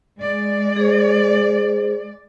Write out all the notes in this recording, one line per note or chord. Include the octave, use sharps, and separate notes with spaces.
G#3 D5
G#4 C5